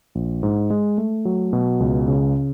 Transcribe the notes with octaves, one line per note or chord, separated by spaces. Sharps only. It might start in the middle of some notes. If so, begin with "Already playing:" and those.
A#1
G#2
G#3
A3
F#3
B2
C#2
C#3